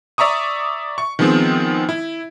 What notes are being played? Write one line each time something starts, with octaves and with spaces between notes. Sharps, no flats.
D5 E5 A#5 C#6 D#6
C#6
D#3 F3 G#3 B3 C4
E4